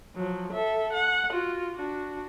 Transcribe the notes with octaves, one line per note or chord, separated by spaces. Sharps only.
F3 F#3
A4 E5
F#5
F4 F#4
D4 F#4